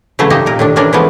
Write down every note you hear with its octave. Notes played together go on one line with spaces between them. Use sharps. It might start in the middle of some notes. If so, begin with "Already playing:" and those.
C#3 E3 F#3 A3
A3 A#3 D#4 G4 D#5 G5
A#2 A#4
A2 D#3 D4
A2 E3 C#4 D4 A#4 D5
E3 F3 G#3 A3 B3